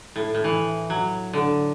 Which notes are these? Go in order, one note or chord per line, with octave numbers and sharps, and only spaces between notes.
A2
A2
E3
F#3
D3